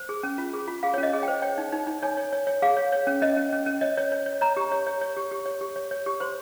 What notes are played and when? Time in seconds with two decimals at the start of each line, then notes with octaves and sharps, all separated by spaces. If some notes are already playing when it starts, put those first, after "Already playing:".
Already playing: C5
0.09 G#4
0.23 C#4
0.38 F4
0.53 G#4
0.68 F4
0.83 G#4 F5
0.94 C#4 C#5
1.03 D#5
1.13 G#4
1.23 C5 G5
1.42 C#5 G5
1.58 D#4
1.72 D#4
1.87 D#4
2.03 C#5 G#5
2.17 C#5
2.33 C#5
2.47 C#5
2.62 G#4 F5
2.77 C#5
2.92 C#5
3.07 C#4
3.22 C#4 D#5
3.37 C#4
3.52 C#4
3.66 C#4
3.81 C#5 D#5
3.97 C#5
4.12 C#5
4.26 C#5
4.41 C#5 A#5
4.57 G4
4.72 C#5
4.87 C#5
5.01 C#5
5.17 G4
5.32 G4
5.46 C#5
5.61 G4
5.76 C#5
5.91 C#5
6.06 G4
6.20 C5 C6